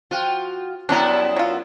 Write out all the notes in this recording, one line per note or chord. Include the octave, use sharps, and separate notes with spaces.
F3 F4 F#4 G5
F#2 G3 B3 D4 E4 C#5 A#5
F#3 F4